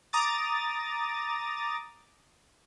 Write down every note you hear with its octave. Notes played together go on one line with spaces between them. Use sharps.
A#5 D6 D#6 A6